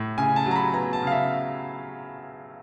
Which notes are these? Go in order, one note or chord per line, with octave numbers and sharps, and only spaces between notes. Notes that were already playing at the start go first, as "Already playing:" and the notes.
Already playing: A2
C#3 G#5
A5
F#3
A#5
B5
B3 A#5
A5
C#3 F5
E5